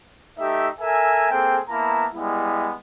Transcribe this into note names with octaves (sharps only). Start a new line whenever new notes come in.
A3 D#4 G4 E5
A4 A#4 E5 G#5
A#3 C4 G#4 A4 G5
A#3 B3 E4 A5 A#5
G3 G#3 B3 E4